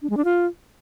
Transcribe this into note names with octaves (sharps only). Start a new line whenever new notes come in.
D4
G#3
D4
F4